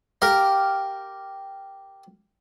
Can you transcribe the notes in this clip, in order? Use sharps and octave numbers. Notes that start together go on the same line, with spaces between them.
G4 A#4 F5